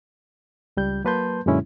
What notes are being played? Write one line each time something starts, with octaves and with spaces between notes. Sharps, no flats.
C#2 G3 G6
F#3 A#3 B4 A5 C6 G6
F#2 A#2 D3 G#3 C#4 E4